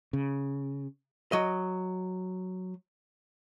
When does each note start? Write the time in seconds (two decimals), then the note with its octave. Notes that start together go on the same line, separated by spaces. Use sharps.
0.13 C#3
1.32 F#3 D#5